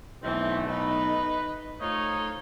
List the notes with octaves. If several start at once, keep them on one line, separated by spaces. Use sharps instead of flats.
B1 E3 A3 C4
D#4 B4
A3 D#4 F4 C5 C#5